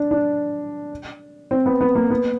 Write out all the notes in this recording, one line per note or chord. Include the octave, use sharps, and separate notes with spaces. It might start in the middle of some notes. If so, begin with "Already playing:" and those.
Already playing: D4
D4
C4
B3
B3
A#3
B3